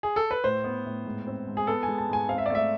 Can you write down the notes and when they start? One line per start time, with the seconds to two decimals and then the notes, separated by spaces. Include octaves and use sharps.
0.03 G#4
0.16 A4
0.31 B4
0.44 A2 C5
0.64 B3
0.86 A2
1.05 G#2
1.27 C4
1.47 G#2
1.57 G#4
1.67 B3 A4
1.83 G#5
1.88 G#3
1.98 A5
2.09 G#2 G#5
2.29 C4 F5
2.38 E5
2.46 D5
2.50 A3 E5